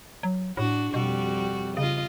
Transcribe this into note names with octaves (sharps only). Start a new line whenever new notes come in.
F#3
A2 D4 F#4
F2 B2 G3 F#4
C#3 F4 D#5